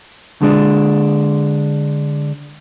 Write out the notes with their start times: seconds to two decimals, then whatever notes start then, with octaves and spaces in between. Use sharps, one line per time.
0.41 D3 G#3 D4